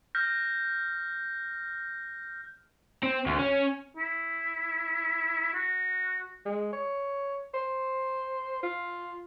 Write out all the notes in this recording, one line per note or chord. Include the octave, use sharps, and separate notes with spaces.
F6 G6 A#6
C4
D2
C#4
E4
F#4
G#3
C#5
C5
F4